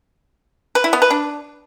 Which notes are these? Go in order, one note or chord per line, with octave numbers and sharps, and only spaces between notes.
B4
E4
B3
B4
D4